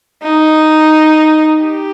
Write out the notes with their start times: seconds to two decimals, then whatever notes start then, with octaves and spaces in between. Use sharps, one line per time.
0.23 D#4
1.61 G4